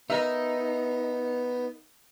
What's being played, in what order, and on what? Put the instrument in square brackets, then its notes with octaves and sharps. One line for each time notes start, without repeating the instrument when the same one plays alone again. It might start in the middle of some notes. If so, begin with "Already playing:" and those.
[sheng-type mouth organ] B3 [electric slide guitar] D#4 [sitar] A#4 E5